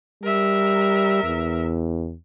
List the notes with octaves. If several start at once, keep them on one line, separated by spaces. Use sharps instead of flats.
G3 A#4 E5
E2